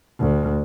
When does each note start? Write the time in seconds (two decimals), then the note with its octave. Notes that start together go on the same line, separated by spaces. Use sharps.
0.19 D2